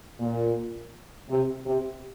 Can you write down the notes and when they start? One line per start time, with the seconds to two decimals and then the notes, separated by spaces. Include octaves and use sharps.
0.19 A#2
1.29 C3
1.66 C3